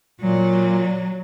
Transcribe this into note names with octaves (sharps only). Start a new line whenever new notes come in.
A#2 F#3